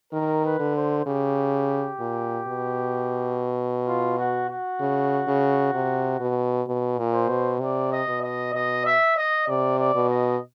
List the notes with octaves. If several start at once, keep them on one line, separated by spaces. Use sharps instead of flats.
D#3 A#4
B4
D3
C5
C#3 G4
A#2
B2
F4
F#4
F#4
C#3
C#3
C3
B2
B2
A#2
C5
B2
C3 D5
D#5
B2
D#5
B2 D#5
E5
D#5
C3 D5
D5
B2
D#5